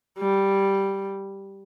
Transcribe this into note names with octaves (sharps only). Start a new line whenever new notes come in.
G3